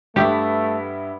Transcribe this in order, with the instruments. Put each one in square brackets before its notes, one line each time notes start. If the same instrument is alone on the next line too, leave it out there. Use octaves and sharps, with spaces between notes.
[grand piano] G2 E5 [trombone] A3 [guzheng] B3 [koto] G4